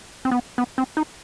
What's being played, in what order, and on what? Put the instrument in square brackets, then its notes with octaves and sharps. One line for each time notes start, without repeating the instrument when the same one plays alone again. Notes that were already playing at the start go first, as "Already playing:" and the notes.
[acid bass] C4
B3
B3
C4
D#4